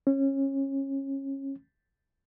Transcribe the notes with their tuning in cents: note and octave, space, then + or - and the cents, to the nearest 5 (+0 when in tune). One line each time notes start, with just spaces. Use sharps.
C#4 -25